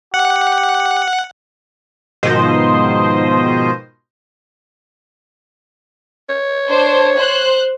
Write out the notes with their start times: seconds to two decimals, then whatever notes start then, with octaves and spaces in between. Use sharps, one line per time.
0.14 G4 F#5
2.23 G#2 B2 D#3 F3 C5 D#5
6.29 C#5
6.69 D4 C5
7.17 C5 F#6